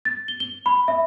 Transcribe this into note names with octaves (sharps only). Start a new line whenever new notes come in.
A6
G7
G7
B5
E5